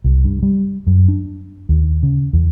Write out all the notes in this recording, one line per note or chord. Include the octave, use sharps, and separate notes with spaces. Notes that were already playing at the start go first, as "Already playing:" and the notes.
C2
G2
G3
F#2
D4
D#2
C#3
E2